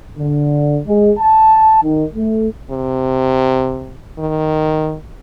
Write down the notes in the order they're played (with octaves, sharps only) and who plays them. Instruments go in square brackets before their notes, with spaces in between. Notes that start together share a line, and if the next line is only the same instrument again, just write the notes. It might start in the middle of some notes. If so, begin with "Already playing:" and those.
[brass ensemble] D3
G#3
A5
D#3
A3
[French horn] C3
D#3